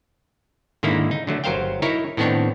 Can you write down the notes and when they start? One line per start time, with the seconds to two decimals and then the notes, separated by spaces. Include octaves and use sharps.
0.83 G#2 D3 D#3 A#3 D#4 E4
1.11 D#4
1.27 D3 F#3 A3
1.44 G1 F#3 A#4 C5 F5 G5
1.82 D#4 E4 A#4 C#5
2.17 A2 D#3 B3 C4 D4 C#5